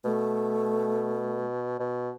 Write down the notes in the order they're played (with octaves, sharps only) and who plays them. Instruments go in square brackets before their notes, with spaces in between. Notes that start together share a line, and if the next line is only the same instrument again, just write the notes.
[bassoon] B2 [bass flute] A3
[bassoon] B2